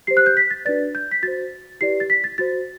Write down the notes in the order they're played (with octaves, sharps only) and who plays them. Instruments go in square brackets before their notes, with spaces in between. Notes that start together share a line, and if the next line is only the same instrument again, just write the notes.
[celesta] G4 C5 C7
F#6
G6
B6
A6
D4 F#4 B4 D5 A6
G6
B6
F#4 C5 A6
E4 G4 B4 D5 C7
A6
B6
A6
F#4 C5 A6